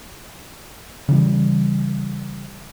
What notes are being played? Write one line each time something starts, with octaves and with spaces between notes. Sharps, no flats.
C#3 E3 G3